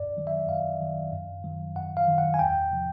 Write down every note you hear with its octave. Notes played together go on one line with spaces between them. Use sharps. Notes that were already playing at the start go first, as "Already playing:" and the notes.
Already playing: F#2 D5
D#3 F#3
E5
F#2 F5
D#3 F#3
F#2
D#3 F#3
F#2 F#5
F5
D#3 F#3
F#5
G#5
E2 G5
C3 F3